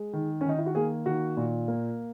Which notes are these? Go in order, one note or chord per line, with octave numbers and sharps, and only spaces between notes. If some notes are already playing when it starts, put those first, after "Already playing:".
Already playing: G#3
D#3
C#4
D#3 D#4
E4
F#4
A#3 G#4
D#3 F#4
A#2
A#3